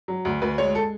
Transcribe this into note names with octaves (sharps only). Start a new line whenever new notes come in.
F#3
D2
D2 B4
G#3 C#5
A4